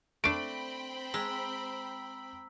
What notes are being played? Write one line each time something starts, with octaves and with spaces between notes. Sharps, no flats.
A3 C4 D4 G5 B5 D7
G#3 A#5 E6 B6